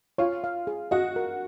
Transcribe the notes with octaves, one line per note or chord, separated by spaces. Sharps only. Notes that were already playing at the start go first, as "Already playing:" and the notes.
F4 C#5
F5
G#4
F#4 D#5
A#4